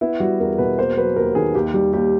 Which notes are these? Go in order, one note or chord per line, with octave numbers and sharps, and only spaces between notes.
B3 E4
G3 F#4
E2 A#4
B2 B4
A#3 C5
F#3 B4
D#2 A#4
D#3 G#4
D#2 G4
G3
D#2 G4